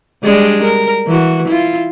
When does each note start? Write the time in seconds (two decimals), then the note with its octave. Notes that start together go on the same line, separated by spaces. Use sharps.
0.24 G3 G#3 D4
0.64 A#4
1.07 E3 F#4
1.48 E4 F4